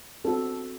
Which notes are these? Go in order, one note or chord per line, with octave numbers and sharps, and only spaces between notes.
C4 F#4 A4